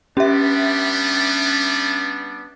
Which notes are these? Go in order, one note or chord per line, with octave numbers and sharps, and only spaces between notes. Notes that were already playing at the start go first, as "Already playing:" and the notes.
G3 B3 C#4 D4 G4 E5